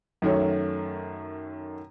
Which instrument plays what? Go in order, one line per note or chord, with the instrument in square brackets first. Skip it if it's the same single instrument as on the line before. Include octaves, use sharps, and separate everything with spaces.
[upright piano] F#2 D#3 F#3 A3 C#4